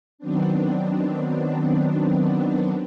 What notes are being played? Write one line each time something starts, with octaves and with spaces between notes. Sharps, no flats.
D#3 F#3 B3 C4 D4